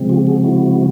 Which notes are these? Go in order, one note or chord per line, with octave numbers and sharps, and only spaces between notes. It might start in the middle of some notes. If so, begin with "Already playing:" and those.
Already playing: C#3 F3 G#3 C4
F4 G4
F#4 G#4
E4 F#4